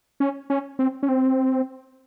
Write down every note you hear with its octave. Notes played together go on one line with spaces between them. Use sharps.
C#4
C#4
C4
C#4
C4